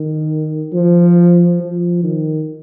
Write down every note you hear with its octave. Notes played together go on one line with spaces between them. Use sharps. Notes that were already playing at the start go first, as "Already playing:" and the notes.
Already playing: D#3
F3
F3
D#3